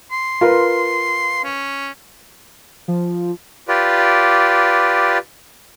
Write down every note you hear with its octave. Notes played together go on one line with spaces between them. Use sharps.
C6
F4 A#4 B4
C#4
F3
F4 G4 B4 D5